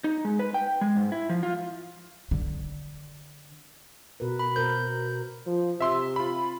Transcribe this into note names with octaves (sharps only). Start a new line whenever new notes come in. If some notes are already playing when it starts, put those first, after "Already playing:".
D#4
G#3
B4
G5
G#3
G#2
E4
F3
F4
D3
B2 A#4 B4
B5
B2 A#4 C5 G6
F3
C3 E5 C6 E6
F4 B5